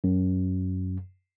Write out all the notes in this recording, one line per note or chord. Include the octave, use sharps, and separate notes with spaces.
F#2